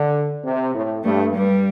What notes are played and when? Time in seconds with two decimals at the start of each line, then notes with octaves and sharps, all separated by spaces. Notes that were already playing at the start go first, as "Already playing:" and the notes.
Already playing: D3
0.44 C3
0.73 A2
1.04 G2 A3
1.35 G2 G3